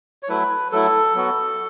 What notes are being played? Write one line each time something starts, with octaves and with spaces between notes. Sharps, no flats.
C#5
F#3 A3 E4 B4
F#3 A3 E4 A4
F#3 B3 F#4